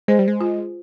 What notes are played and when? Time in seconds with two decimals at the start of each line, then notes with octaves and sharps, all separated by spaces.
0.08 G#3 C5
0.19 G3
0.28 G#3
0.41 F4